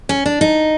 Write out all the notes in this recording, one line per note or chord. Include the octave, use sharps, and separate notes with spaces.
C#4
D4
D#4